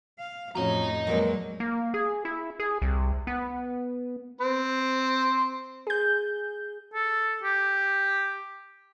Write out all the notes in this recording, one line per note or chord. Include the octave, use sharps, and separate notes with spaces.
F5
F2 A2 C#4 F#4 D#5 A#5
B2 F#3 G#3 A#3 D5
A#3
G#4
E4
G#4
C2
B3
C4
G#4 G6
A4
G4